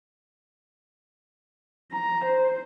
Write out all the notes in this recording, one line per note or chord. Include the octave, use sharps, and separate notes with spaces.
A#5
C5